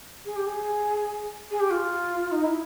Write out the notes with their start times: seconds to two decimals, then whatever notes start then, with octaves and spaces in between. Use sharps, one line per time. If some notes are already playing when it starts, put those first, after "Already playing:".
0.25 G#4
0.36 G4
0.46 G#4
1.51 G#4
1.60 G4
1.70 F4
2.32 D#4
2.44 E4